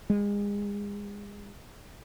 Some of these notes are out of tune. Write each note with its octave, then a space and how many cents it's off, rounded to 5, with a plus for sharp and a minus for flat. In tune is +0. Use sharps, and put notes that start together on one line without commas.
G#3 -35